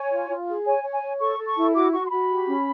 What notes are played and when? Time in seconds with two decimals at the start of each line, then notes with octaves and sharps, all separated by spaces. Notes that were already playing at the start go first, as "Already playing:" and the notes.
Already playing: C#5 G#5
0.11 F4
0.30 F4
0.48 G#4
0.66 C#5 G#5
0.84 C#5
0.93 G#5
1.03 C#5
1.20 A4 C#6
1.38 A4
1.47 C#6
1.56 E4
1.74 F#4 D6
1.92 F#4 C#6
2.06 C6
2.11 F#4 B5
2.29 G4
2.47 C#4